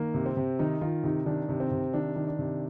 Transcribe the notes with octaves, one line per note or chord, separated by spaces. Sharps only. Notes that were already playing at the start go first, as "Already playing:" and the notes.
Already playing: D#3 A#3
C3
C4
C3
D#3 D#4
D#3 F4
C3 D#4
D#3 D4
C3
C4
C3
D#3 D4
D#3
D4
C3